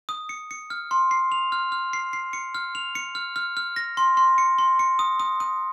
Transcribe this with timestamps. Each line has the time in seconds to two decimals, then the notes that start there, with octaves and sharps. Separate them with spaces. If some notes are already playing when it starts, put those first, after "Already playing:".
0.09 D#6
0.29 C#7
0.51 C#7
0.70 F6
0.91 C6
1.11 C7
1.32 F7
1.52 F6
1.72 F6
1.93 C7
2.13 C7
2.33 C#7
2.55 F6
2.75 F7
2.95 C#7
3.15 F6
3.36 F6
3.57 F6
3.76 A#6
3.97 C6
4.17 C6
4.38 C#7
4.59 C6
4.79 C#7
4.99 D#6
5.20 D#6
5.40 D#6